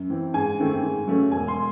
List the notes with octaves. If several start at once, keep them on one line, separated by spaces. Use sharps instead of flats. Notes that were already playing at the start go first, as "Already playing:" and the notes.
Already playing: F#2
E3 C4
G#2 G#5
D#3 A3 C4
G#2
F#3 A3 C#4
E1 G#5
C6